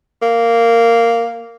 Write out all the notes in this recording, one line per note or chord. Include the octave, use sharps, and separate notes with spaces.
A#3